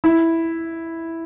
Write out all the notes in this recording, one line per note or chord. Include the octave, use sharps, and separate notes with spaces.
E4